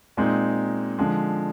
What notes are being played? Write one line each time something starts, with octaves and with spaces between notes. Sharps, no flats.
A#2 G#3 C4 D#4
D3 F3 G#3